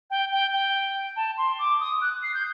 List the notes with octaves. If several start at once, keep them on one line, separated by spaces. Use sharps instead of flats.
G5
G5
G5
A5
C6
D6
D#6
F#6
C7
G6